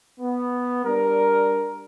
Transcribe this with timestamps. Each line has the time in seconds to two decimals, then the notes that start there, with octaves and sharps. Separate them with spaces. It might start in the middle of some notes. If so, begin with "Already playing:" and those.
0.20 B3
0.84 G3 D4 A#4